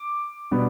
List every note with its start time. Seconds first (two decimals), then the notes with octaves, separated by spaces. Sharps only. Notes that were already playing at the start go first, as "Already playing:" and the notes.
Already playing: D6
0.51 B2 G3 B3 D4